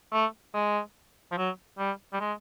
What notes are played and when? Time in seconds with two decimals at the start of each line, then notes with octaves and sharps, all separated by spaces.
0.13 A3
0.54 G#3
1.31 F3
1.37 F#3
1.79 G3
2.13 G3
2.20 G#3